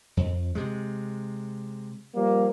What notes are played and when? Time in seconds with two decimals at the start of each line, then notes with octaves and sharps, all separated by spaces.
0.17 F2
0.55 C3 G#3
2.15 F3 G3 A#3